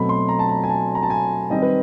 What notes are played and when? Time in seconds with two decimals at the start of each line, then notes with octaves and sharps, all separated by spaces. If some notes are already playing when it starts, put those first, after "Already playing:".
Already playing: B2 F#3 A3 C4 B5
0.09 C6
0.29 A#5
0.39 A5
0.49 A#5
0.64 G#5
0.69 A5
0.95 A#5
1.03 A5
1.10 G#5
1.50 D#3 G3 C4 D#5
1.62 B4